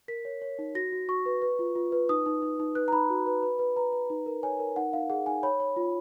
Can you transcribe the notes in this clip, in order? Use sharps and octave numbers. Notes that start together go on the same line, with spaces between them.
A#4 B6
C#5
C#5
D#4
F#4 A#6
F#4
F#4 C#6
B4
B4
F4
F4
B4
D#4 D#6
D#4
D#4
D#4
B4 F#6
A#5
D#4 B5
F#4
B4
B4
B4
B4 A#5
B4
D#4
A#4
C#5 G#5
A#4
D#4 F#5
D#4 F5
G#4 F#5
D#4 G#5
C#5 B5
C#5
F4